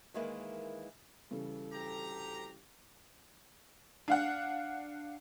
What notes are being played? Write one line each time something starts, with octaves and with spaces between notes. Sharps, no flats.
D#3 E3 G#3 A#3 E4
C#3 E3 G3 A4
D2 A2 G4 A#5
D4 F5 F#5